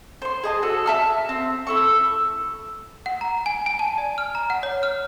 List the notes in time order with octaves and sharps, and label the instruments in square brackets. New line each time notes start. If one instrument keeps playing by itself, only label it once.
[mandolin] C5 C6
G#4 D#5 A5
F#4 A4
E5 A5 F6
C4
E4 A4 C#6
[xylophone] F#5
A#5
G#5
G#5
A5
D5
F6
A#5
F#5
C#5
F6